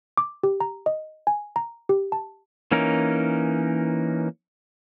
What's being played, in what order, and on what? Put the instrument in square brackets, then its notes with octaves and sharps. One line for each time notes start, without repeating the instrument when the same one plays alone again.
[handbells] D6
G4
A#5
D#5
G#5
A#5
G4
A5
[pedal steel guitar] E3 A#3 C#4 D#4 A#4